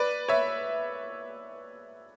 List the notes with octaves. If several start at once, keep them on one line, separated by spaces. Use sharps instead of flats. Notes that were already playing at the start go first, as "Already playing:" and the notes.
Already playing: B4 D5
C#5 E5